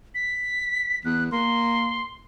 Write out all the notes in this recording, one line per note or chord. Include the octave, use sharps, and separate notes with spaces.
B6
E2 F#6
A#3 C6